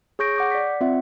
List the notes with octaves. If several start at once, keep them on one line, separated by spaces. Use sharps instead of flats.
G#4 C#5 C#6 G6 A#6 D7
F#5 D6 G6
D5 B6
C4 F4 E5 F#5